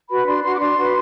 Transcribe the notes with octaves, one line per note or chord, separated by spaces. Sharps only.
F#4 B4 B5
D4 C6
F#4 B4 C6
D6
D4 C6
F#4 B4